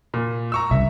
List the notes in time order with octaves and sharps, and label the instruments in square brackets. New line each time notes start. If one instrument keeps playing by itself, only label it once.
[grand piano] A#2
A#5 C#6 E6
[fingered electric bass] C2 C#3 [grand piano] E5